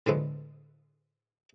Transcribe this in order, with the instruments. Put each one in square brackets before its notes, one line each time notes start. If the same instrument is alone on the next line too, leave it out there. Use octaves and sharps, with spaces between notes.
[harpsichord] A2 D3 F3 G#3 A3 B3